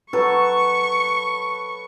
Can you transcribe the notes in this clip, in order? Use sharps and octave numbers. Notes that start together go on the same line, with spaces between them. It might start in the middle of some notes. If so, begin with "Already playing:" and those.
F#3 A4 B4 C#6